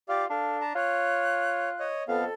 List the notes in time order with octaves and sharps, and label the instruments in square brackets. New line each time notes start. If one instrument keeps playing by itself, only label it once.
[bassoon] F4 [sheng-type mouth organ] G4 D5 F5 [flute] D6
[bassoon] D4 [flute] A4 [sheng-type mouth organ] F5
[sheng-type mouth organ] A5 A#5
[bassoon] F4 [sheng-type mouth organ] C#5 [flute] F#6
[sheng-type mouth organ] C#5 D#5
[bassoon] F2 [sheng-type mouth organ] B3 F5 [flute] A4